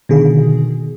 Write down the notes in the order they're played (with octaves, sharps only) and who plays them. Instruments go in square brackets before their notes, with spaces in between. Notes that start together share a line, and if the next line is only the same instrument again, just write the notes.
[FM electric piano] B2 D3 D#3 G#4